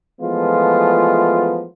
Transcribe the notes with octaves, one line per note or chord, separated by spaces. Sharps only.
E3 F3 G#3 A3 B3 F4